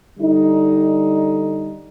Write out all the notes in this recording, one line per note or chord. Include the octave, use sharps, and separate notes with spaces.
D3 G3 D#4